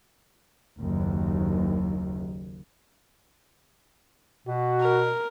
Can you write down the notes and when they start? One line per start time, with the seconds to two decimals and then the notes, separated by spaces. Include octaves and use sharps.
0.80 F#1 D#2
4.47 B2 F#4
4.81 A#4